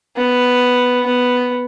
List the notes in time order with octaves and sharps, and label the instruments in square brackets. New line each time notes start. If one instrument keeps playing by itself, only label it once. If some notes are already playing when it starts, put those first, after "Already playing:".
[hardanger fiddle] B3
B3